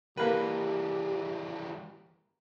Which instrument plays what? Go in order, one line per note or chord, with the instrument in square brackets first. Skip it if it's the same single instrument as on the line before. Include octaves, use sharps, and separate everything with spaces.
[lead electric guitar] E3 G3 [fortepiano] A#3 B4 [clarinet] G4